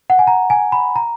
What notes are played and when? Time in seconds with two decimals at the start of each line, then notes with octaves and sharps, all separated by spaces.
0.10 F#5
0.19 G#5
0.27 A#5
0.50 G#5
0.72 B5
0.96 A#5